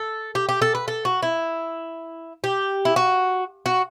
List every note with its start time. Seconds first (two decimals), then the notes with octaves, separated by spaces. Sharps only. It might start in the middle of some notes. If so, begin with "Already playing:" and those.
Already playing: A4
0.35 G4
0.49 G4
0.62 A4
0.75 B4
0.88 A4
1.05 F#4
1.23 E4
2.44 G4
2.85 E4
2.96 F#4
3.66 F#4